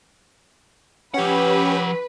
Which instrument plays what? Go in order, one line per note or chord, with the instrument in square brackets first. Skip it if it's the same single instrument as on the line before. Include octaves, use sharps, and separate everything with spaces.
[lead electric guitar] F3 F#5 [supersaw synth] C#4 G4 [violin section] B4